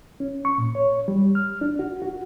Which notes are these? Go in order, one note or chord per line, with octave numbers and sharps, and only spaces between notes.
C#4
C#6
A#2
C#5
G3
F6
D4
F#4
F#4